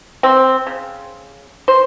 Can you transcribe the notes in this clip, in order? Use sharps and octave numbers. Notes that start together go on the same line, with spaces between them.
C4
C#3
C5